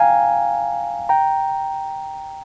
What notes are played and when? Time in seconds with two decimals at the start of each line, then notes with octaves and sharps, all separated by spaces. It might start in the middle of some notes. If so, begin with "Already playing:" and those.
Already playing: F5 G5 G#5 A#5
1.09 G5 A#5